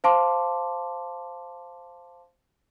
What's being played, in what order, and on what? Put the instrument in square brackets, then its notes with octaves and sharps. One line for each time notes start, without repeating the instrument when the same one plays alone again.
[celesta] C5 F5 A5 C6 D6